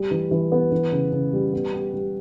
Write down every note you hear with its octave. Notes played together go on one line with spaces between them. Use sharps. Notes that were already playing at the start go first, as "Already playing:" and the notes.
Already playing: G3
E3
E3
B3
E3
C#3
C#3
G3
B3
G4
G3